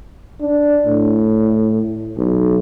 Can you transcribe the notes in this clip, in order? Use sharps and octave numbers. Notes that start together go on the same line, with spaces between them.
D4
A2
B1